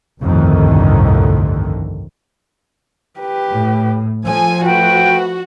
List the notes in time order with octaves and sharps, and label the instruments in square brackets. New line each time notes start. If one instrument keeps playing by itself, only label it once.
[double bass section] G1 C2 F2 A2 D3 D#3
[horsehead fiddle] G4 B4
[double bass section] A2
[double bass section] F3 [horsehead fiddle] A4 [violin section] G#5
[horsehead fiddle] A3 B4 [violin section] F#4 [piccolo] G5